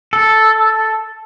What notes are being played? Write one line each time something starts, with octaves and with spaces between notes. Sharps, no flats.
A4